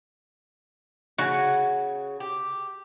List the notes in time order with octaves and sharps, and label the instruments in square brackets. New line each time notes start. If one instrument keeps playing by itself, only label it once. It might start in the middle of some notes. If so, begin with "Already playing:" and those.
[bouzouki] C#3 G#5 [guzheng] F#4
[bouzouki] G4